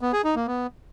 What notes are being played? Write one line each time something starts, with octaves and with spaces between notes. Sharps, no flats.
B3
G#4
D#4
A#3
B3